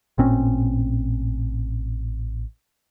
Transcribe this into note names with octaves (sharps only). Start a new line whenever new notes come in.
A1 A#2 C4 C#4